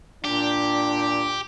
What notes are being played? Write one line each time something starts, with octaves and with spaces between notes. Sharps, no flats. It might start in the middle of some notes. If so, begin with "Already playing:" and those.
A#2 D4 G4